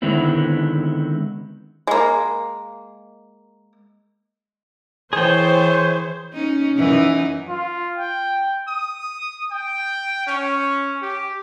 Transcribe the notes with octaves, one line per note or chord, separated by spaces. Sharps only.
D3 D#3 G#3 B3 C4 E4
G#3 A#3
E3 G#4 C5 C#5 G5
C#4 D#4
F#2 E3 D#4
F4
G5
D#6
G5
C#4
G4